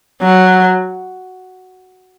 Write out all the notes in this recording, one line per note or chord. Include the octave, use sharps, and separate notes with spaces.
F#3